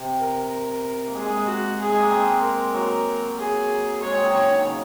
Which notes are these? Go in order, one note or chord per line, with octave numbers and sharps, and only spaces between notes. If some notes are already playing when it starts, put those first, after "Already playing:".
Already playing: C3
A#4
A#3
G#3 G#4
G#3
G#3
F#4
G#4
G#3
A#3
G#3 C4
A#4
F#3 A#3
G#4
G#3 C#5
G#3 C4
F#3 A#3
C#3 C#5
D#3
C#3